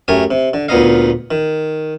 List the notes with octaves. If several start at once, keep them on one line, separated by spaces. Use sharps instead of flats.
F#2 A3 G4 A#4 G#5
C3
D3
D2 A#2 B3 D#4 D#5 F5
D#3